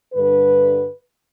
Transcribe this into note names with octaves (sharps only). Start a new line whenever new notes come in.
G2 D3 B4